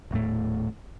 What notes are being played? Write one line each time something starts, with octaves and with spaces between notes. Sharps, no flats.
D#1 A2 A3